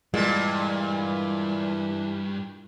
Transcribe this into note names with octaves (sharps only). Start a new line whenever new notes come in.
G2 A#2 E3 G#3